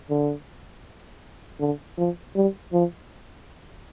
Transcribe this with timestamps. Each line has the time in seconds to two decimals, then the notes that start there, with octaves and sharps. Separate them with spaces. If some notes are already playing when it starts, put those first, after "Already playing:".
0.10 D3
1.60 D3
1.98 F3
2.35 G3
2.73 F3